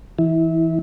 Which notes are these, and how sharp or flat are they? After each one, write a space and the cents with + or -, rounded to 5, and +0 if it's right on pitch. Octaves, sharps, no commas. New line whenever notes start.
E3 +0 E4 -25